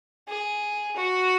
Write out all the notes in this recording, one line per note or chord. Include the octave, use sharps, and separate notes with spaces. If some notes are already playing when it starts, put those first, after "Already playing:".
G#4
F#4